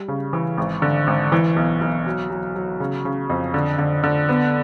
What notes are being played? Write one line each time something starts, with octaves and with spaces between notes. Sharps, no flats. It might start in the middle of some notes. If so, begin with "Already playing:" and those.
Already playing: G3
C#3
E3
G#1
D3
G#1
E3
B1
B1
F#3
F#3
F#3
C#3
C#3
F2
D3
D3
D3
B3